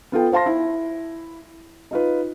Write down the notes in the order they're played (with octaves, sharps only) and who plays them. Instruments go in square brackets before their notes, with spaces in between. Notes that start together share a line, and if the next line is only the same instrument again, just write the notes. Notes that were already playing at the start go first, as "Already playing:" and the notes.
[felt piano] B3 F4 A4 G5
C5 F5 A5 C6 A#6
E4
D#4 F4 B4